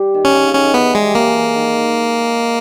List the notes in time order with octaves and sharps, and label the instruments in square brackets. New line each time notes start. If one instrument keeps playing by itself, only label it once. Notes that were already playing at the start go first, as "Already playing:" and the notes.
Already playing: [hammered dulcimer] G3 G4
D#3
[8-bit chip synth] C#4
[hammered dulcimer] C#3
C#3
[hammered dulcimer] D#3 [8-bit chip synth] C#4
[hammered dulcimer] D#3
[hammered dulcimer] E3 [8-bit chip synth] B3
[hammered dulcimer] G3 [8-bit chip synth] G#3
[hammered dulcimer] G#3 [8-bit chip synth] A#3
[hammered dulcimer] E3
D#3